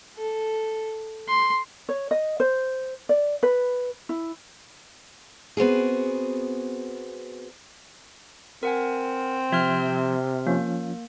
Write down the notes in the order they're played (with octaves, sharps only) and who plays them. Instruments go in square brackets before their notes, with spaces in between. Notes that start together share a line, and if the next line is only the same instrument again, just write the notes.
[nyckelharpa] A4
C6
[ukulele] C#5
D#5
C5
D5
B4
E4
[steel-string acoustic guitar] B3 C4 F#4 G#4
[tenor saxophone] C4 [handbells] A#4 F#5 G#5
[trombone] C3 [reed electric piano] F3 G#6 [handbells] E5 C6 F6
[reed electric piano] F3 C#4 F4 [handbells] A#3